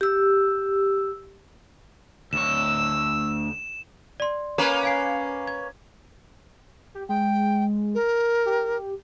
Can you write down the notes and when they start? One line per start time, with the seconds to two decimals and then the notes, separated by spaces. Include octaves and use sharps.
0.01 G4 E6
2.33 D2 C#5 E6 E7
4.20 D5 C6
4.58 A#3 C#4 B4 A#5
4.83 F5 G#5 C7
5.48 G#6
6.95 G4
7.09 G#3 G5
7.95 A#4
8.46 G4